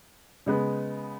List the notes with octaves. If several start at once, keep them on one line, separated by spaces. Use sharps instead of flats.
C#3 G#3 B3